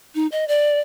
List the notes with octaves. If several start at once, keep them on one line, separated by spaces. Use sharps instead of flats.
D#4
D#5
D5